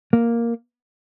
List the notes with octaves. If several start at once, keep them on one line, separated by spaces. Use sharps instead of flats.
A#3